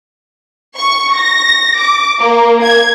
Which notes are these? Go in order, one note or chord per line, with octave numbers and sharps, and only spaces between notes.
C#6
A#6
D6
A#3
G#6